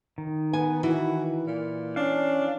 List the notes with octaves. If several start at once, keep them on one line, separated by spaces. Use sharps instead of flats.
D#3
B3 B4 G#5
E3 F#4
A#2
C#4 D4 F5